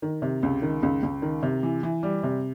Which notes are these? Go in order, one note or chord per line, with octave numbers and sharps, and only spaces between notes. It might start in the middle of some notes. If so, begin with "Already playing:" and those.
D#3
C3
C#2
D#3
C#2
C#2
D#3
C3
E3
E3
G3
C3